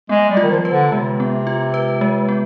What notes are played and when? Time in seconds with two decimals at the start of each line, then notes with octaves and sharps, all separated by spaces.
0.09 G#3 B3
0.30 G3
0.37 F4
0.43 D#3
0.51 F3
0.65 B4
0.72 D3
0.92 C3 G#3
1.20 B3
1.47 F4
1.74 B4
2.01 G#3
2.29 B3